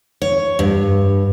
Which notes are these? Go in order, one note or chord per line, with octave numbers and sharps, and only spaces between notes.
C#5
G2